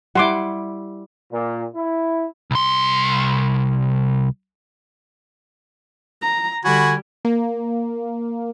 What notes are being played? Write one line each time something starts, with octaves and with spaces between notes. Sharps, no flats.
G3 E4 F#5 C6 D6
A#2
E4
C2 C6
A#5
D3 G3 F#4 G#5 B5
A#3